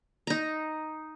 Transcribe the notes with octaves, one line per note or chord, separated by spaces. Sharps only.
D#4 A#5